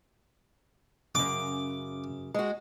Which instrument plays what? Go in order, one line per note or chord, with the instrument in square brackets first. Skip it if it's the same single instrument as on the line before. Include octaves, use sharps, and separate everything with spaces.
[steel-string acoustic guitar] F#2 C#3 [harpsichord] D6
[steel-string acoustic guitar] G#3 F#4